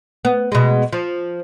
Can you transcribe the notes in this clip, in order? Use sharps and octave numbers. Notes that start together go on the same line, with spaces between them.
B3
B2 G#3
F3